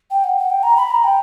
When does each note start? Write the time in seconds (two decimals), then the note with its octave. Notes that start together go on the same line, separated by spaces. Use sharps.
0.11 G5
0.24 F#5
0.37 F#5
0.50 G5
0.63 A#5
0.77 B5
0.91 A#5
1.04 G5